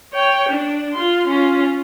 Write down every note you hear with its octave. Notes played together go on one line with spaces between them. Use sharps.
C#5 G5
D4
F4 C6
C#4 F4